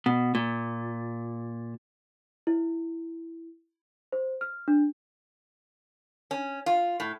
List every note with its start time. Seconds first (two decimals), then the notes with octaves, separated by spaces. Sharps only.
0.06 B2
0.35 A#2
2.47 E4
4.12 C5
4.41 F6
4.68 D4
6.31 C#4
6.66 F4
7.00 A2